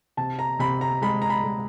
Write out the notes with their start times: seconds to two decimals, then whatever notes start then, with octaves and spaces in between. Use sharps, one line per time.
0.17 C3 A5
0.39 A#5
0.59 C3 B5
0.81 A#5
1.02 G#3 B5
1.22 A#5
1.30 B5
1.44 G#3